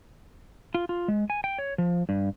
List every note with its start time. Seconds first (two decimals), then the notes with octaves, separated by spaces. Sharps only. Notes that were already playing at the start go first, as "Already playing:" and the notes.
0.74 F4
0.89 F4
1.08 G#3
1.30 G#5
1.44 G5
1.58 C#5
1.78 F3
2.09 G2